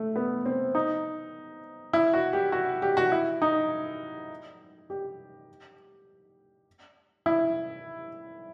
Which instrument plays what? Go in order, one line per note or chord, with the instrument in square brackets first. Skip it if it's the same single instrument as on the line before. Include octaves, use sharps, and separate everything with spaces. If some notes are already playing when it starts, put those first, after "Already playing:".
Already playing: [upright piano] A3
B3
C4
D#4
E4
F#4
G4
F#4
G4
F#4
E4
D#4
G4
E4